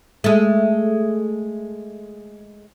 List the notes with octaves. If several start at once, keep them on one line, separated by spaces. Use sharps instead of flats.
G#3 A3